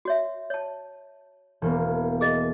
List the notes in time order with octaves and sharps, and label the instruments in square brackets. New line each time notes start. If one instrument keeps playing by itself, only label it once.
[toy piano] F#4 C#5 E5
C#5 A5
[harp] E1 A#3 B3
[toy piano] G#4 D#5